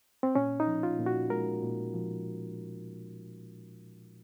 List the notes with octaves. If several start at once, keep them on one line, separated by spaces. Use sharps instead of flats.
C4
A#2 C#4
D#4
F3
F4
A#2
F#4
G#3 A#4
A#2
F3